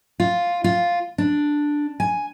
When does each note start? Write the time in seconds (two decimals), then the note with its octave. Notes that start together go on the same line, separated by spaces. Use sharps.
0.20 F4
0.64 F4
1.18 D4
2.00 G#5